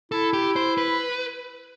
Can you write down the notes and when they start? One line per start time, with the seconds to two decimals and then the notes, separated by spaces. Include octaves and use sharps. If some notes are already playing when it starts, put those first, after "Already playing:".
0.12 E4 A4
0.33 G4
0.56 C5
0.78 B4